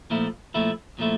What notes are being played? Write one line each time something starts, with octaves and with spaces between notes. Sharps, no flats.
A#2 F3 A3 E4
A#2 F3 A3 E4
A#2 F3 A3 E4